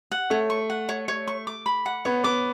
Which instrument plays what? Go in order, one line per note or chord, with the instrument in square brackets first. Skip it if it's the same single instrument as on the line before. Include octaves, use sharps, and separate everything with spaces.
[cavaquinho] F#5
[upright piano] A3 [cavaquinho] C#5
[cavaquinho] C#6
F#5
C#5
C#5
C#6
D6
B5
F#5
[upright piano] B3 [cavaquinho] C#5
[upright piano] B3 [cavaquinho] D6